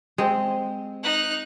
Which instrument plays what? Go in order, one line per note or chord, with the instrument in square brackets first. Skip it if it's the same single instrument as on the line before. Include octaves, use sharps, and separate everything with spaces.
[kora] G#3 C4
[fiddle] D#4 F#6